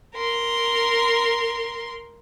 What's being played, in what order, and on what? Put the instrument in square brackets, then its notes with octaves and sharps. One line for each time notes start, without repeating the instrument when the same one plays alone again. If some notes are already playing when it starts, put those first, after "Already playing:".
[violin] A#4 C6